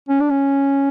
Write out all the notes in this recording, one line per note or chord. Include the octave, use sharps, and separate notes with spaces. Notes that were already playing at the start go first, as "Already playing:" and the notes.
C#4
D4
C#4